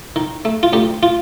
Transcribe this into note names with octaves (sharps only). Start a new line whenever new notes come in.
D#3
A3
F4
D2 G4
F4